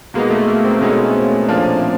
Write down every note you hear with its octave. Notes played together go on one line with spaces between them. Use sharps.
B2 G#3 A#3 B3 D#4
A3
A#3
C4
B2 G#3 B3 C#4 D#4
A#2 F3 A#3 D4